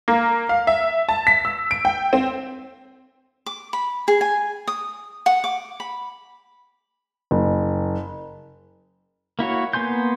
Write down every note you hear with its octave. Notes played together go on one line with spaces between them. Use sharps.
A#3
F5
E5
A5
B6
E6
D7
G5
C4
D6
B5
G#4
G#5
D#6
F#5
D6
B5
F#1
A#3 E4 F#4 C#5
A#3 B3 G#5 C6 G6